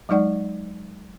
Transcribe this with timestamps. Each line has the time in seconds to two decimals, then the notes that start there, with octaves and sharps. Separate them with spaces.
0.09 F#3 G#3 D#4 D5 F#5